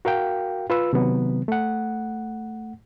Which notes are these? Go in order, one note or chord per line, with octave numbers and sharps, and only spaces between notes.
F#4 A#4 F5 G5
F4 B4 E6
C3 D#3 F#3 B3
A3 F#5